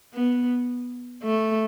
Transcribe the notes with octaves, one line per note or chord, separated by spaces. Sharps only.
B3
A3